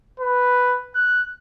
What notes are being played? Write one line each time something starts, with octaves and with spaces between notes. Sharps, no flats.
B4
F#6